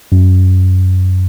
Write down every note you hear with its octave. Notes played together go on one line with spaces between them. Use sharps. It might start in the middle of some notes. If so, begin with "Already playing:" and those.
F#2